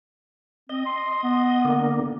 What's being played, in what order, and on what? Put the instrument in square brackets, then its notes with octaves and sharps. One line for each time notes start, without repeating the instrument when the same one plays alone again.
[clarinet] C4 [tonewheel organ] D#5
[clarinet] C6
B3
[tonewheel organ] D3 A#3